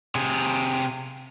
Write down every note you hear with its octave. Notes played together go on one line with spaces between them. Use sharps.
C3 G#4